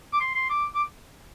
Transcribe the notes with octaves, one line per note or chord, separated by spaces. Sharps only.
D6
C6
C6
D6
D6